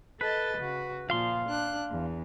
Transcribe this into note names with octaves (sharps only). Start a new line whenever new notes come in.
A4 B4 D#5 A6
C#3 F#4
A#2 F3 F5 C6
D4 F#6
E2